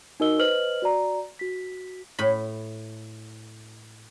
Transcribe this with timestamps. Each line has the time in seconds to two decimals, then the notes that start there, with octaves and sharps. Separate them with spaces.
0.20 D#4 F#4 A#4 D#5 E6 G7
0.39 B4 C5 D#5 F6 F#7
0.82 F#4 D5 A#5
1.39 F#4 B6
2.19 A2 B5